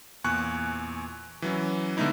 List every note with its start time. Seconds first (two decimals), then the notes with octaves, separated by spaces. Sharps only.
0.24 E2 A#2 G#5 C#6 F#6
1.42 E3 F#3 C#4
1.97 D3 G#3 A3 B3 D#4 E4